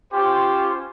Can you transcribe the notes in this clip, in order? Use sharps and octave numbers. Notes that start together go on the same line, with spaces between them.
C#4 F4 G4 C5